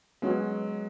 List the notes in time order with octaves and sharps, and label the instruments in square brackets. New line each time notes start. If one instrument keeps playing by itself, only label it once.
[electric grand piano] F#3 G#3 [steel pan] B3 C#4 F#4